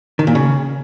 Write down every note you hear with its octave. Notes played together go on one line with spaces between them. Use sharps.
D#3
A#2
C#3